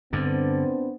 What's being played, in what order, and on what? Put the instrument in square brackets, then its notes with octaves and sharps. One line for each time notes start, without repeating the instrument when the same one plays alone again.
[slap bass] G2 D3 [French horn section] B3 C4 D4